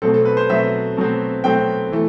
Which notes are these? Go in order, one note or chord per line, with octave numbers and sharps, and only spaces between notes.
B2 F#3 A3 C4 A4
A4
B4
C5
B2 F#3 A3 C4 E5
B2 F#3 A3 C4
B2 F#3 A3 C4 G5
E3 A3